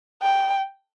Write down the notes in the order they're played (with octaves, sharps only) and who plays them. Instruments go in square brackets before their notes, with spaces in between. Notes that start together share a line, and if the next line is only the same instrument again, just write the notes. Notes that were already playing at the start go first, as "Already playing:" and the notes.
[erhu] G5